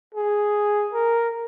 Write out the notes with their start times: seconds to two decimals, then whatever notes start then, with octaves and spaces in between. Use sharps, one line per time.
0.15 G#4
0.93 A#4